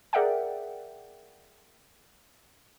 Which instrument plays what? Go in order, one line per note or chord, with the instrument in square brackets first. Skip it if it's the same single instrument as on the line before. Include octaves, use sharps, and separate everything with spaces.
[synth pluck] G#4 A#4 D5 E5 F#5 G5